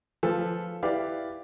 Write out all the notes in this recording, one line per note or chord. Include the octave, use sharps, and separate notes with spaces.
F3 A4 B4
E4 G4 B4 D5 F5